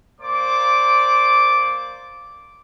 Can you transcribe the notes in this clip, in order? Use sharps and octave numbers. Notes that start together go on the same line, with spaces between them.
A#3 C5 D5 D6